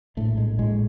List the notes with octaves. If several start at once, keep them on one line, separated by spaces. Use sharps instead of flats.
A#1 A2 A3
G#3
A#1 A2 G#3